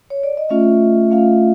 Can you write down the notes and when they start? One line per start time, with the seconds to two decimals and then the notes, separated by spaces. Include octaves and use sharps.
0.10 C#5
0.23 D5
0.37 D#5
0.49 A3 C#4 F4 E5
1.11 A3 C#4 F4 F5